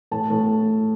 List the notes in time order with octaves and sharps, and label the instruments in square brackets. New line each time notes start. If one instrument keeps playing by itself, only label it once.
[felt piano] A2 A5
A2